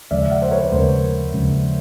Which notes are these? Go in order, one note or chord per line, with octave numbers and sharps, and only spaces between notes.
D#2 C#3 F3 G#3 D5 E5
E5 F#5
C5
B4 C#5
D#2 C#3 F3 G#3 A#4 C5
D#2 C#3 F3 G#3